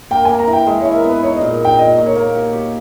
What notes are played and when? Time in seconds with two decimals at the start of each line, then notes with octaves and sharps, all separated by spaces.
0.11 A#3 G5
0.25 A#3 G#5
0.39 A#5
0.48 E3
0.53 G5
0.67 G#3 E5
0.81 E4 C#5
0.95 A#4
1.04 B3 B4
1.23 D#4 C#5
1.37 A#2 D#5
1.60 D#4 G5
1.79 A#2 D#5
1.97 A#2
2.06 C#5
2.16 A#3
2.34 G4
2.53 G4